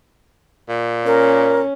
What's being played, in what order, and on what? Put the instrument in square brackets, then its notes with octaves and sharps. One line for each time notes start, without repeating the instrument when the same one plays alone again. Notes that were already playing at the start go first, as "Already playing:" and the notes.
[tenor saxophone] A#2
[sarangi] C#4 [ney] A#4